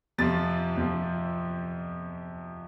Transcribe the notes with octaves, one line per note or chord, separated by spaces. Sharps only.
F2 C3 F3 A6
F2 C3 F3